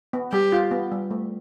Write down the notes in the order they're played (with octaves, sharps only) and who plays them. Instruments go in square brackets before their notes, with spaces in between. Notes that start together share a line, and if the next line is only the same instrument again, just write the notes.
[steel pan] B3
[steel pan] G3 [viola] G4
[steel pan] F4
B3
G3
A3